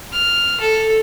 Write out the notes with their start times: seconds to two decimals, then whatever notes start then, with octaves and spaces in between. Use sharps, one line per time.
0.13 F6
0.61 A4